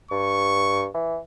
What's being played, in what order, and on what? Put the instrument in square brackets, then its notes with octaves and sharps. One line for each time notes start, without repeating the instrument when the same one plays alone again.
[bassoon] G2 [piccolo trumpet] C#6
[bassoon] E3